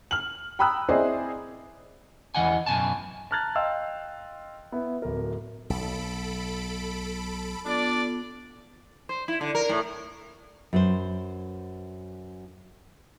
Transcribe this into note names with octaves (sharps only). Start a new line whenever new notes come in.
F6 F#7
G5 A#5 B5 D#6 E6 F#6
C4 E4 G#4 C5 D5 D#5
E2 E3 D#5 F#5 G#5
F#2 B2 G#5 A5
A5 A#5 F6 F#6 A6
D#5 F5 G5 C6 E6
B3 E4
D1 A#4
B1 A4 B5 D7
B3 D4 F4 A4 D5 D6
C5
E4
D3
A#4
A2
F#2 B4 C5